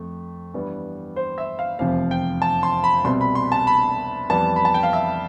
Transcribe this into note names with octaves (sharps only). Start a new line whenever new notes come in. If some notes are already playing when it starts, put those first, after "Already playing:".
Already playing: F2 A3
G2 E3 G3 B3
C5
E5
F5
F1 E2 C3 F3 F5
G5
A5
C6
B5
C2 B2 G3 C4 C6
B5
C6
A5
B5
F2 E3 G3 B3 A5
B5
A5
G5
F5
E5